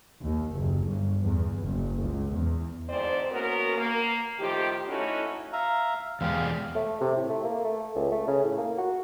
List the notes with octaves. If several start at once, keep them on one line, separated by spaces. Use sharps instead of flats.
D#2
F#1
G1
E2
F#1
C#2
E2
D2 G#2 E3 C4 C5 D5
A#3 B3 C#4 F#4 A#4
A#3
A2 D#3 F3 G4
A3 C#4 D#4 E4 F#4 A4
E5 F5 A#5
E2 G#3 G4 F5
A3
C3
A2
A3
A#3
A3
C#2
A3
C#3
A2
A#3
F#4